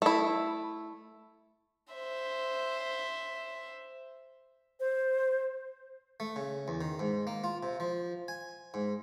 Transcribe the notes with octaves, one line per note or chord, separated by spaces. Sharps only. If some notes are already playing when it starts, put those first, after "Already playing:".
A3 E4
C5 E5
C5
A3
C#3
E2
D#3
G#2
A#3
F4
C3
F3
G#5
G#2